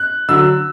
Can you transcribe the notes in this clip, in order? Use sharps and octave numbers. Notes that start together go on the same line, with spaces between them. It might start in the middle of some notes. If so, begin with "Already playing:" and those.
Already playing: F#6
D3 F#3 E6